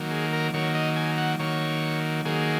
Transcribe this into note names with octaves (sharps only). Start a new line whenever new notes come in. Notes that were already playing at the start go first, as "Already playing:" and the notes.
Already playing: D#3 F#3 A#3
G#4
A#4
D#3 F#3 A#3 C#5
D#5
G#5
F#5
D#3 F#3 A#3 C#5
D#3 F#3 A#3 G#4